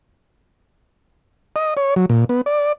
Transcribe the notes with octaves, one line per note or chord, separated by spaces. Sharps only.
D#5
C#5
F#3
A#2
B3
D5